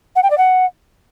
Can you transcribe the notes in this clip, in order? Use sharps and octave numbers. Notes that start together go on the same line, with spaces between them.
F#5
G5
D5
F#5